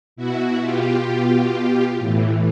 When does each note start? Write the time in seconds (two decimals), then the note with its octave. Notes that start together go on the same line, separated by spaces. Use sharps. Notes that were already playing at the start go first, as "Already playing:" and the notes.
0.16 B2 E4 F#4
0.61 F4 G4
1.07 B2
1.98 A2 E3